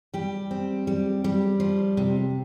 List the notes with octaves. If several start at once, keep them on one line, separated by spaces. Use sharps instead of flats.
G3 G4
C4
G3
G3
F3
C3